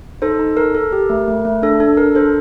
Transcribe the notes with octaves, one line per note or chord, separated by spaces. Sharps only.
D#4 A4 C5
D#4
A4 A#4
A4
G4
A3
A3
A3
D4 A4
D4 A4
D4 A#4
D4 A4 C5